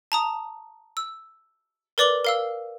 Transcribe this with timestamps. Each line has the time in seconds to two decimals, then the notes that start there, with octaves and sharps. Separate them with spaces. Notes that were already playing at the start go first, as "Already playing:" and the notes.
0.12 A5 A#5 D#6
0.97 E6
1.98 A#4 B4 D5 D6 F#7 G7
2.25 A#4 F5 E6